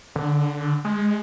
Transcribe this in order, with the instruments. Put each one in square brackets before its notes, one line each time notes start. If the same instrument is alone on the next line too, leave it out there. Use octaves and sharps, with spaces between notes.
[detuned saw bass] D3
G#3